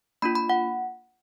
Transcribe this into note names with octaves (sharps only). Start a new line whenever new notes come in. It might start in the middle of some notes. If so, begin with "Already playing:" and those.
A#3 D4 F4 B5
B5
F#5